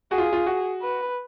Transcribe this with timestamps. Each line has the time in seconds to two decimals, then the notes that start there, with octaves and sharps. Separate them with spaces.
0.11 F#4 G#4
0.18 F4
0.33 F4
0.46 F#4
0.82 B4